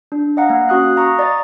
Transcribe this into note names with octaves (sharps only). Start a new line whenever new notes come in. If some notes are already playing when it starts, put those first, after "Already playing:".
D4
D#5 F5 F#5 A#5
A#3
C#4 F#4 D#6 F#6
F5 A#5 C#6 D#6
D5 D#5 A#5 A6